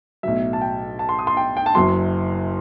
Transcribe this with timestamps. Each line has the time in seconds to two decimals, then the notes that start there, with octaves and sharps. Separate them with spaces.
0.23 B1 A2 F#3 E5
0.53 A5
0.61 G5
0.99 A5
1.09 C6
1.19 D#6
1.27 C6
1.37 G5
1.57 G5
1.66 A5
1.75 F#1 F#2 F#3 C6